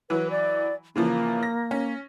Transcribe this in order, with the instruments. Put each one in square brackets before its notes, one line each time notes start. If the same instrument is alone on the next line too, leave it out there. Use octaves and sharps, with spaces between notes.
[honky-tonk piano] E3 F#3 [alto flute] B4
[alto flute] D5
[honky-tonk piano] C#3 E3 F3 [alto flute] A#3
[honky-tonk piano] A#6
C#4